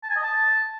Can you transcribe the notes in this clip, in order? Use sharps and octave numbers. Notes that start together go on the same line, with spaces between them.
A5
G#5
D#5
A5